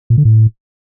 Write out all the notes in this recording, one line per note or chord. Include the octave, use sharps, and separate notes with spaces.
A#2
D3
A2